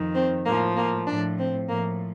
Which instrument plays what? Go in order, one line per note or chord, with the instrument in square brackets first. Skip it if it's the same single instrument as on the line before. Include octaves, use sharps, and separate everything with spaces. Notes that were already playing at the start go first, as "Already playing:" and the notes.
Already playing: [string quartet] F2 D#3
C4
A2 F3 A#3
A#3
A2 F3 D4
C4
A2 F3 A#3